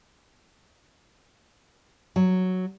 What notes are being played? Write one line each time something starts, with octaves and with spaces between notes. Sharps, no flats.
F#3